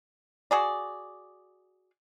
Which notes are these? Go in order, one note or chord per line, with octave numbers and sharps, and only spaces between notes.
F#4 G#4 D5